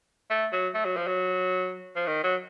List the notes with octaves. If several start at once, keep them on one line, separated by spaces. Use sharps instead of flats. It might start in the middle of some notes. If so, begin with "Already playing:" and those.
A3
F#3
A3
F#3
F3
F#3
F3
D#3
F#3